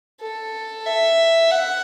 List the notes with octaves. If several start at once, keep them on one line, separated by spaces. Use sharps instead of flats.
A4
E5
F#5